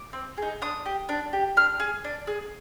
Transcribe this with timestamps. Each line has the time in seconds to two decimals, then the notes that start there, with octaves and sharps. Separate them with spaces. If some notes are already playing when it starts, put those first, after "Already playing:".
Already playing: D6
0.13 C4
0.38 D#4 G#4
0.62 D4 D#6
0.86 G4
1.09 D4
1.33 G4
1.57 D4 F6
1.80 G#4
2.04 D4
2.27 G#4